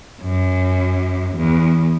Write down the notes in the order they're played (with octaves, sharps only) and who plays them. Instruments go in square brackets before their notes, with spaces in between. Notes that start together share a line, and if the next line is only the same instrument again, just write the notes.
[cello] F#2
E2